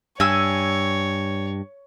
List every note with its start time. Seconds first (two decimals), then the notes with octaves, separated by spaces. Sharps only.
0.20 G2 C#5 G#5 E6